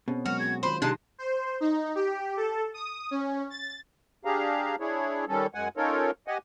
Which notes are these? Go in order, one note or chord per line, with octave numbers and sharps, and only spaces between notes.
B2 C4 C#4 G#4
F#3 G#3 F#4 A#4 F6
G#4 G#6
D#3 F4 F#4 C5 B5
C3 G#3 D4 D#4 G4 A5 F#6
C5
D#4
G4
A4
D#6
C#4
A6
D4 G4 G#4 F5 A#5
D4 E4 G#4 C#5
D#3 G3 C#4 A4
F#2 G#3 F#5 G#5
C#4 D#4 F4 A4 A#4 C#5
G4 D#5 F#5 G#5